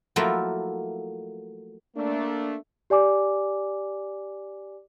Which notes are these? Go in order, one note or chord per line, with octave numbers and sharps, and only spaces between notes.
F3 F#3 A3 A#3 E4 F4
A3 A#3 D4
G4 D5 G#5 D6